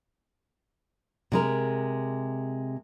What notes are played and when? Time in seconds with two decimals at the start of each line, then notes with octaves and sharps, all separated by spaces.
1.32 C3 G#3 A#4